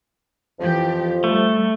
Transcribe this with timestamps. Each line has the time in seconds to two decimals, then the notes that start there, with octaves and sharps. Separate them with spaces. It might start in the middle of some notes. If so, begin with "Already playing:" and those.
0.59 F2 E3 F3 G4
1.24 G3 A3